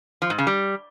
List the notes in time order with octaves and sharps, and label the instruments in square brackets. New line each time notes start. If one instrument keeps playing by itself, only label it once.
[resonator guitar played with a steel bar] F3
G#2
C#3
G3